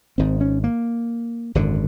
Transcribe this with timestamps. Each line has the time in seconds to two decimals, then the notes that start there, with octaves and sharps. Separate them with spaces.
0.18 G#1 G#2 C4
0.41 C#4
0.64 A#3
1.55 G#1 F#2 D3